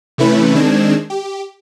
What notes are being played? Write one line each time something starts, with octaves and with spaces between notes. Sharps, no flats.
C3 E3 A3 C#4 E4 B4
D#3 G#3 C4 D4 G#6 E7
G4